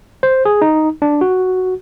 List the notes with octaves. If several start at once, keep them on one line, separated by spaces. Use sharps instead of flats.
C5
G#4
D#4
D4
F#4